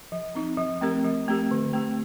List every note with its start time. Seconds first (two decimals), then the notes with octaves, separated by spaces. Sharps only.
0.12 F3
0.35 C4 D#4
0.58 F3
0.81 A3 C4 G4 A#4
1.04 F3
1.28 A3 C4 G4 A#4
1.51 D3
1.74 A3 C4 G4